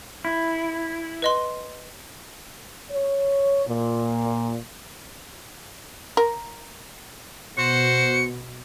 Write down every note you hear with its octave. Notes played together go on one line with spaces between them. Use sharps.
E4
B4 D#5 C6
C#5
A#2
A#4
B2 F#4 C5 C#7